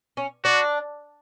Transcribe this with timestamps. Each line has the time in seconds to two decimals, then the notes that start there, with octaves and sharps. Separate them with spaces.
0.17 C#4
0.44 D4 F#4